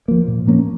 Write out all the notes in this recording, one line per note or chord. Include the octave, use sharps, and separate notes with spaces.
F3 A#3
A#2
F3 A#3 C#4